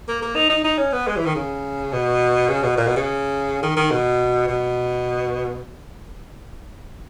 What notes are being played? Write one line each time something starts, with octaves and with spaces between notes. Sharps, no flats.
A#3
A#3
D#4
D#4
D#4
C#4
B3
G#3
E3
D#3
C#3
B2
C#3
B2
A#2
B2
C#3
D#3
D#3
B2
B2